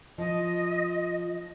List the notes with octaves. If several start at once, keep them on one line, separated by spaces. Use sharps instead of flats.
F3 D#5